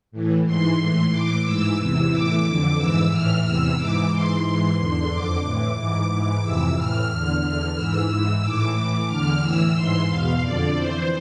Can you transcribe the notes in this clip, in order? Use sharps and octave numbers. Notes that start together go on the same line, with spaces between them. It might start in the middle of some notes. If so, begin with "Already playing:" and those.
A2 E3
G#2 E3 C6
A2 E3
A2 E3 D6
G#2 E3 E6
E2 C3 E3 E6
A2 E3 D6
F2 D3
G#2 E3 E6
A2 E3 F6
E2 C3 E3 E6
G#2 E3 D6
G#2 E3 C6
G#2 E3
E2 D3
F2 D3 D6
A2 E3
G#2 E3 D6
G#2 E3
F2 C3 E3 E6
A2 E3 F6
E2 D3
E2 D3 F6
G#2 E3 E6
G#2 E3
A2 E3 D6
A2 E3 D6
E2 D3 F6
A2 E3 E6
G#2 E3 C6
E2 B2 F5
F2 D3 D5
F2 E3 C5